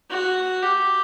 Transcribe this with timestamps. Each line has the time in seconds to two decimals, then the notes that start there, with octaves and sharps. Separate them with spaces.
0.10 F#4
0.63 G4